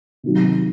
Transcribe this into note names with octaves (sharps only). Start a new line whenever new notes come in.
C3 D#3 F#3